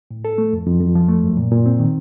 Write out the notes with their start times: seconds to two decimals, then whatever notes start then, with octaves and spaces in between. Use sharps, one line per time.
0.11 A2
0.25 A4
0.38 A3
0.53 F2
0.67 F2
0.81 F2
0.95 F3
1.09 A3
1.24 F#2
1.37 A#2
1.52 A#2
1.66 C4
1.79 D#3